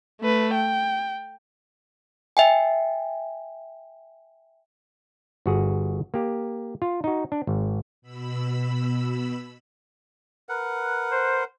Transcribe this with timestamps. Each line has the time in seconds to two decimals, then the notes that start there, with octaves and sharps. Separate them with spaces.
0.21 A3 B4
0.55 G5
2.37 E5 G5 G#5
5.46 G1 F#4 G#4
6.14 A#3 G4
6.82 F4
7.04 D#4 F#4
7.32 D4
7.47 G#1
8.02 B2 B5 E6
10.49 A#4 B4 F#5
11.11 C5